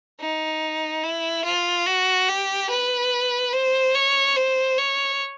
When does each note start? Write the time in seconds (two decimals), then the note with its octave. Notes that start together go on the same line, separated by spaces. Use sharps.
0.20 D#4
1.04 E4
1.44 F4
1.86 F#4
2.29 G4
2.70 B4
3.53 C5
3.95 C#5
4.36 C5
4.78 C#5